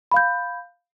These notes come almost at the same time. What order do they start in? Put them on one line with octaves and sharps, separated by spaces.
B5 F5 G6